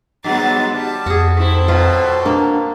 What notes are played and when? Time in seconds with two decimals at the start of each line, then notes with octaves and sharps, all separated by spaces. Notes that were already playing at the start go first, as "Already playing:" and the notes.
0.24 G2 F#3 G#3 B3 A6
0.75 G3 A5
1.06 F2 F#4 G#4
1.37 G#2 C4 E4 A4
1.68 B2 F#3 F4
2.26 A#3 D4